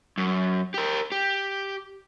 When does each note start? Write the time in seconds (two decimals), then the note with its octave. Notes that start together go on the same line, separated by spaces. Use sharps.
0.18 F#2
0.74 G4 A#4
1.12 G4